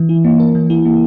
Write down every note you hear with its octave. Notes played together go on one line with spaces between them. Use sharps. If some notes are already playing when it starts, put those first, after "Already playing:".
Already playing: E3
E4
A#3
A#4
E3
E4
A#3